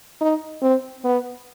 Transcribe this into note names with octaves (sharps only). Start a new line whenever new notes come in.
D#4
C4
B3